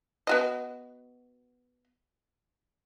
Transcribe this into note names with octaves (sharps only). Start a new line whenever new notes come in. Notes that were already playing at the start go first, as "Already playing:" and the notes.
B3 F#4 D#5